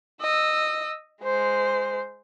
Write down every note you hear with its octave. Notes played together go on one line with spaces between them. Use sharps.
D#5 E6
G#3 C5